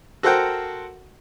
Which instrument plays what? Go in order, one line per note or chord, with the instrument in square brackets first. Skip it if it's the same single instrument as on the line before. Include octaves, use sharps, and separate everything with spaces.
[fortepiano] F#4 A4 A#4 C5 F#5 G5